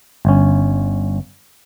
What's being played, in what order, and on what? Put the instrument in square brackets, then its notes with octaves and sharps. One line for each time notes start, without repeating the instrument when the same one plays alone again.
[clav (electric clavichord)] G1 C#4